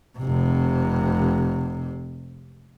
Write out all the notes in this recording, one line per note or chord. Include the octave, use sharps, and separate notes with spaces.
F1 C3